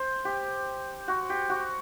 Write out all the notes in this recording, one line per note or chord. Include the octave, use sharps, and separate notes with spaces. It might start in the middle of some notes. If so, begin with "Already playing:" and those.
Already playing: C5
G4
F#4
G4
F#4